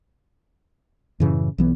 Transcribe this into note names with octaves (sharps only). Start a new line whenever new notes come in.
F#2 A2 C#3 E3
B1 E3 B3